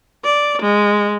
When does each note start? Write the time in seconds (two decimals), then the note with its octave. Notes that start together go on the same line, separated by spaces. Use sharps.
0.25 D5
0.62 G#3